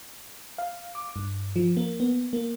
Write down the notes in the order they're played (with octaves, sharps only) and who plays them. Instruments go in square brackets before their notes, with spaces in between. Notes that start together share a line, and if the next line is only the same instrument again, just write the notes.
[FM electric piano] F5
D6
G2
F3
A#3
B3
A#3